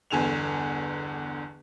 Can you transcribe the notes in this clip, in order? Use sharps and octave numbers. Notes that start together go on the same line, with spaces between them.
G1 E2 D3 G#5 E7 F7